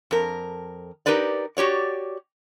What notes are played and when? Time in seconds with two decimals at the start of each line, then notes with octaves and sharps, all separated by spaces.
0.11 F2 A#4
1.06 D#4 G4 A#4 B4 D5
1.57 F#4 G4 C#5 D5